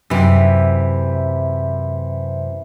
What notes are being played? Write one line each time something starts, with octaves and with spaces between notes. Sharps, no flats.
F#2 C3 E3